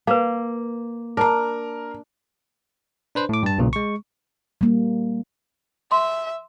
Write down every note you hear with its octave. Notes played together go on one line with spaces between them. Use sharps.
A#3 B4 F5
D4 A#4 A#5
D4 B4 C5
A2 D6
G2 A5
B1 A#2 C#3
G#3 C#6
G3 A#3
E5 C6